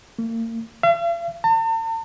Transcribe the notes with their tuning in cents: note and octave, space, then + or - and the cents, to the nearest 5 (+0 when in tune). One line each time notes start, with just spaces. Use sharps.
A#3 -40
F5 -45
A5 +45